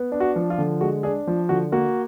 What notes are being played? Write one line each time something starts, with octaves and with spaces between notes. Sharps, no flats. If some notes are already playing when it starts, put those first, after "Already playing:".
Already playing: B3
D4
F#4
F3
F4
D3
G#3 F#4
D4 G#4
F3
D3 F#4
A#3 F#4